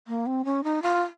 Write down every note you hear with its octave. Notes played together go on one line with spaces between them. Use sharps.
A#3
C4
C#4
D#4
F4